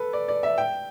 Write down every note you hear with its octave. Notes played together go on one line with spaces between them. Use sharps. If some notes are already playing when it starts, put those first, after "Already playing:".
Already playing: A4 B4
D5
D5
E5
G5